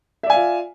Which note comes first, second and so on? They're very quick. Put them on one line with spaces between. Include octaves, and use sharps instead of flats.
E5 D5 G#5 F5 F4